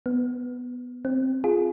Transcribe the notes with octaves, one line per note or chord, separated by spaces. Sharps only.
B3
C4
F4 G#4